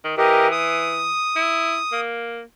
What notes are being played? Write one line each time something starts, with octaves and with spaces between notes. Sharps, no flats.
D#3
E3 G4 A#4 D#5
D#6
E4
A#3